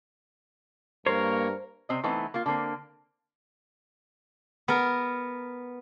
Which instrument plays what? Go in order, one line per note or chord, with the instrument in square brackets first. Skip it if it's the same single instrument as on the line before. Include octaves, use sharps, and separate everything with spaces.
[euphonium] G2 [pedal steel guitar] A#3 C#5 [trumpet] A#4 [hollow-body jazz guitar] C5
[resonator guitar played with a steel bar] C3 C4 D#5
E3 A3 B3 C4 D#4
A#3 F4
D3 A#3 C4
[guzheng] B3 A#4